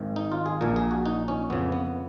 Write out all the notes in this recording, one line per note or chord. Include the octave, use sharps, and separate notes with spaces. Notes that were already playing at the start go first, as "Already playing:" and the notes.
Already playing: G#1 G#2 D#3
D#4
F4
G#4
A#1 A#2 A#4
G#4
F#4
D#4
C#4
F2 C#3 B3
B3